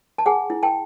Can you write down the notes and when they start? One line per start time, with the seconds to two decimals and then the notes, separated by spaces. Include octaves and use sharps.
0.18 A5
0.26 G#4 F#5 G#5
0.50 E4
0.63 G5 A5